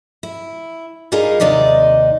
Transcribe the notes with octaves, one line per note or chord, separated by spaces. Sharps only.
E4
G3 D#4 F4 G#4 A#4
D#2 C3 D#4 D5 D#5